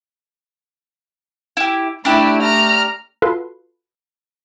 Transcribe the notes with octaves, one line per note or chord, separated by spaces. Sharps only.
E4 G4
A3 D4 E4 G4
A#5 F6
F4 F#4 A4 B4 C6